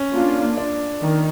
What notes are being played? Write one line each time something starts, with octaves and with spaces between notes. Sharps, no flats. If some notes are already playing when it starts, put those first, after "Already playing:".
Already playing: C#4
A#3 D4 F4
D4
D#3